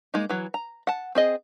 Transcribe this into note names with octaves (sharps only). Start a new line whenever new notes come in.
G#3 A#3 D#4
E3 F#3
A#5
F#5 A5
C4 G#4 D#5